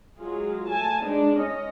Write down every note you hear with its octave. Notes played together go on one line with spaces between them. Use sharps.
F#3 G#3 F4 G#4
A3 G#5 A5
G#3 D4 D#4 G#4
G#3 C#4 D#5